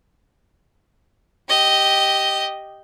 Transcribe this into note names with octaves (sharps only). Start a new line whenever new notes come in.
G4 D#5